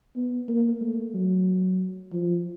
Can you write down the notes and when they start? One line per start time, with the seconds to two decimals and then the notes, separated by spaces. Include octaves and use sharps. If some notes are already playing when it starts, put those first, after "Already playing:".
0.16 B3
0.49 A#3
0.81 A3
1.15 F#3
2.13 F3